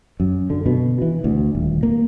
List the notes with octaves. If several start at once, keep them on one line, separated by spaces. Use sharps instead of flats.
F#2
D3
B2
E3
D2
D#1
A#3